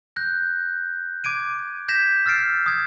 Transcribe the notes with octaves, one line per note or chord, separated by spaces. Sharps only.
F#6 G6 A#6
D6 G#6 D7 D#7
G6 G#6 A#6 B6 E7
E6 F6 A6 C7 D7
D#6 G#6